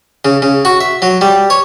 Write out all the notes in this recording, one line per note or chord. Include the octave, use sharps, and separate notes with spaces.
C#3
C#3
F#4
E5
F#3
G3
C#5